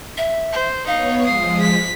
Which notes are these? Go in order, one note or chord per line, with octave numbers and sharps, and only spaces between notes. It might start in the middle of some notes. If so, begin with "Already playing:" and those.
E5
C5
B3 D#4 C#5 F5
F3 G#3 D#6 C7
B6